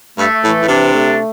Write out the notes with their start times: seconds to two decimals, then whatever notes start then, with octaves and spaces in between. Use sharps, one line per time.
0.18 G2 A3
0.43 A2 E3
0.62 A2
0.68 C3 D4
0.94 A3